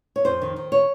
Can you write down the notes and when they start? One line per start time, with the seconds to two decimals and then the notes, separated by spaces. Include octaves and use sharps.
0.16 C#5
0.25 F2 C5
0.42 D#3
0.56 D#3
0.72 C#5